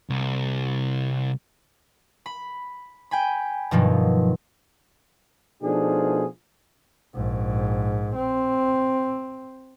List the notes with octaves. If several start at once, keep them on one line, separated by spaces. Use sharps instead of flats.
C2
B5
G5 G#5 B5
G2 B2 D#3 F3 F#3
B2 F3 A3 D4 D#4 G#4
A#1 G#2
C4